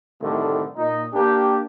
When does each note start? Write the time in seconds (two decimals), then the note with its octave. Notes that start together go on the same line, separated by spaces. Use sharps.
0.22 C2 A2 D3 D#3 A3
0.77 A#2 D#4
1.14 A#3 D4 G4